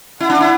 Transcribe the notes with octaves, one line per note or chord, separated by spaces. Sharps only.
E4 F#5
D4
E4